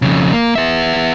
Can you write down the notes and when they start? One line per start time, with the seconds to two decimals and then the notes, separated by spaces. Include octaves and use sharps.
0.02 F2 C#3
0.33 A#3
0.55 B3 E5